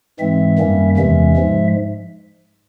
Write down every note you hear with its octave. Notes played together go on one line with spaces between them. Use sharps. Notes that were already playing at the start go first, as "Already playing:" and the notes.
G#2 E3 G#3 C4 E5
F#2 D#3 G3 A#3 C#4
E2 C3 E3 G#3 C#4 E5
G#2 F3 G#3